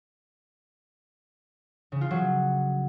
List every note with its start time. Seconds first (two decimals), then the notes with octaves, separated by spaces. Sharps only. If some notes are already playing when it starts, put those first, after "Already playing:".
1.92 C#3
2.01 F4
2.11 F#3